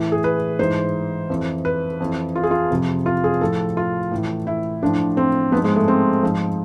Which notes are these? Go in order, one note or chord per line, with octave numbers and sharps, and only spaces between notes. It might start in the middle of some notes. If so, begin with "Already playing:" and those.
Already playing: A2 E3
G#4
B4
G#2 E3 C5
F2 E3
B4
F2 E3
F4
G#4
F4
F2 C3 F3
F4
G#4
A2 F3 A4
F4
A2 E3
E4
A2 F3 D4
C4
G#2 F3 B3
G#3
A3
C4
G#2 F3